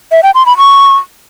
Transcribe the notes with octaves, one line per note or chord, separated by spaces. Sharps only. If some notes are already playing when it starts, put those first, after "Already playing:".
E5
G5
C6
B5
C#6